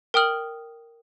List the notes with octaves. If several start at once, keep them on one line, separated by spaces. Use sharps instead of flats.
A#4 G5 D#6 F6 F#7